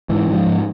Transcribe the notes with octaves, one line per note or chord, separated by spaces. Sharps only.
G#2 E3
G#2
F3
G#2